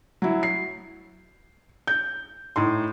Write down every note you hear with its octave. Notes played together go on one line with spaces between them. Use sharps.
F#3 E4
C7
G6
A2 D#4 C6